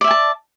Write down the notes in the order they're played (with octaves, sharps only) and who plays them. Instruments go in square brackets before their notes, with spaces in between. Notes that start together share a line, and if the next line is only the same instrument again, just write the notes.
[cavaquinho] D5
E5
G#5
A5